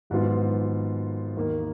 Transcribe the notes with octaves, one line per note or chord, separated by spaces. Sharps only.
G#1 G#2 F#3 B3 F4
D#2 D#3 A#3